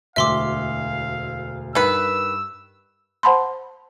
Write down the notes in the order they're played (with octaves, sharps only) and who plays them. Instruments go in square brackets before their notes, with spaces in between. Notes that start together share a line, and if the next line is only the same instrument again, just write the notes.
[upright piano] E1 D2 E6 [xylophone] E5 C6 D6 [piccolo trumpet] F5
[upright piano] G2 [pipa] D#3 B4 [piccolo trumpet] E6
[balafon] C5 F#5 A5 B5 C6